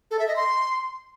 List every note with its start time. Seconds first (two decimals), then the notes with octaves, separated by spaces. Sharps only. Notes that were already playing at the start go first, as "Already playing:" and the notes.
0.11 A4
0.19 E5
0.28 D#5
0.36 C6